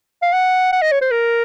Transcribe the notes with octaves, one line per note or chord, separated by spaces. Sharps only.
F5
F#5
F#5
D#5
C#5
C5
A#4